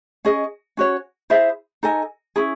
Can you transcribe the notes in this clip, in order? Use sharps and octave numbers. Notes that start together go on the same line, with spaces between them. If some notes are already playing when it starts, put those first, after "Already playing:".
C#4 G#4 D#5
C#4 F#4 C#5
E4 G#4 C5 E5
D#4 A4 D#5 G#5
C#4 E4 G#4